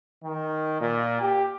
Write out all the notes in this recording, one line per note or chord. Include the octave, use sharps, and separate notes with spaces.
D#3
A#2
G4